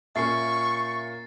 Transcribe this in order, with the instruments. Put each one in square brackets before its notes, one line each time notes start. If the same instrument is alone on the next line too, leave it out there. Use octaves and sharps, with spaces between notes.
[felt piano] A#2 A#3 C#4 [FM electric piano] E5 [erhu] C#6 [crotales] A6 C7